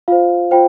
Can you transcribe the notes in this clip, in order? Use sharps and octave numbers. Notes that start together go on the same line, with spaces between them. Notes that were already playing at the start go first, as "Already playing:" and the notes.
F4 C5 F5
F4 C5 G5